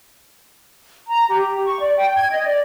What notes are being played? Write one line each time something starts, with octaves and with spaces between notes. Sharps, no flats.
A#5
G4
C#6
D5
G5
G#6
D#5
D5